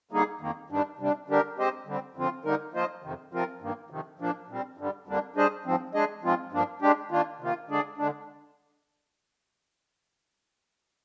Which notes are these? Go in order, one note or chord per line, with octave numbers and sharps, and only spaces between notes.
D3 G3 A#3 D#4 G#4
F2 D#3 A#3
G2 D#3 G3 D4
C3 G3 D4
D3 G3 D4 G4 A#4
G#3 C4 G4 C5 D#5
D3 G3 C4
F2 D3 F3 C4 F4
D3 G3 A#3 D#4 A#4
F3 A#3 F4 C5 D#5
F2 C3 D#3
C3 F3 C4 F4 A#4
G2 D#3 A#3
F2 C3 D#3
A#2 F3 A#3 D4
A#2 G3 C4
G2 D3 G3
F2 D3 G3 A#3 D4
G3 D4 G#4 C5 D#5
G#2 F3 C4
G#3 D4 G#4 D#5
G#2 F3 G#3 C4 F4
G2 F3 A#3 D4
G#3 D4 G4
D#3 A#3 D4 F4
C3 D#3 A#3 F4
D3 G#3 D4 G#4 D5
D3 G#3 D4